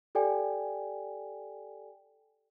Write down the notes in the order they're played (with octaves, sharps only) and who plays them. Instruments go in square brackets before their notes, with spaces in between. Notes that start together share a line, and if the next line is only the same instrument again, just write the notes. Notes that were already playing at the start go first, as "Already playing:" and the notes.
[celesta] G4 A4 D5 G5 G#5